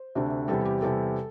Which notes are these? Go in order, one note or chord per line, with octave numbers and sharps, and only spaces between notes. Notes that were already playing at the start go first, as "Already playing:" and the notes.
Already playing: C5
D2 C3 A3 D4
E2 C3 G3 A4
G4
E2 C3 G3 A4